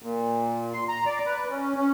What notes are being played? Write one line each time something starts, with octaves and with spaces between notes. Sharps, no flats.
A#2
C6
A#5
D5
B4
C#4
C#4